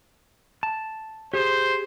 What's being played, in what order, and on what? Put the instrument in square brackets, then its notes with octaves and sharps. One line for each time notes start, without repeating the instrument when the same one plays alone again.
[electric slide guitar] A5
[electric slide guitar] G4 G#4 [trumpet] C5